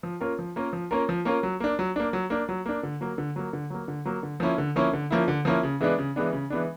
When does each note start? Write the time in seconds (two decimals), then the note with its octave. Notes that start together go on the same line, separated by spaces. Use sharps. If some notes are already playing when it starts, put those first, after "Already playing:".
0.03 F3
0.21 A#3 C#4 F4 A#4
0.39 F3
0.56 A#3 C#4 F4 A#4
0.73 F3
0.91 A#3 C#4 F4 A#4
1.09 F3
1.25 A#3 C#4 F4 A#4
1.43 F#3
1.60 A#3 D4
1.79 F#3
1.96 A#3 D4
2.13 F#3
2.30 A#3 D4
2.49 F#3
2.66 A#3 D4
2.83 D3
3.01 F#3 A#3
3.18 D3
3.36 F#3 A#3
3.53 D3
3.70 F#3 A#3
3.88 D3
4.05 F#3 A#3
4.23 D3
4.40 F3 A#3 C#4 E4
4.58 D3
4.76 F3 A#3 C#4 E4
4.93 D3
5.11 F3 A#3 C#4 E4
5.28 D3
5.45 F3 A#3 C#4 E4
5.63 C#3
5.81 E3 G#3 B3 D4
5.98 C#3
6.16 E3 G#3 B3 D4
6.33 C#3
6.50 E3 G#3 B3 D4